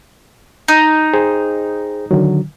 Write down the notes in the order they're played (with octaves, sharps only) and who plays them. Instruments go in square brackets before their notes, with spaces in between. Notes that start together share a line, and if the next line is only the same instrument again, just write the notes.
[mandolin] D#4
[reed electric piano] G#4 C5 G5
D3 D#3 F#3